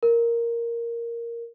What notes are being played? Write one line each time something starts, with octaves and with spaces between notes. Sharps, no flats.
A#4